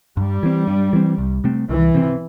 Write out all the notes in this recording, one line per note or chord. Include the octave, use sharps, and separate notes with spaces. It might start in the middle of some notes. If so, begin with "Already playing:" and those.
G2 G3
E3 C4
G2
E3 C4
C2
C3 A3 C4
C2 E3
C3 A3 C4